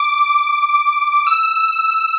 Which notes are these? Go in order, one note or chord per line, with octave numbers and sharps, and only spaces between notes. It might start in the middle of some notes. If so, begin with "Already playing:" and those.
Already playing: D6
E6